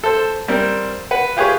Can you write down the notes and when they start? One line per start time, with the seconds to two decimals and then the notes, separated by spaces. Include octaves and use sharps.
0.04 A4 C5
0.48 G3 C4 A#4 C5
1.11 B4 F#5
1.37 F4 G4 G#4 B4 C#5